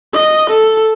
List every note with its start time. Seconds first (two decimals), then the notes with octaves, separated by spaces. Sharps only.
0.13 D#5
0.49 A4